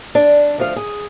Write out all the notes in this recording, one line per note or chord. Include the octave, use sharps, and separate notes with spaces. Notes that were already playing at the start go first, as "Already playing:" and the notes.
D4
D2 F3 F5
G#4